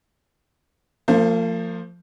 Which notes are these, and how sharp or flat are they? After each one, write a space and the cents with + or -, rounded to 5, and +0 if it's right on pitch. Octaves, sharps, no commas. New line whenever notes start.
F3 +0 A#3 -45 C5 +0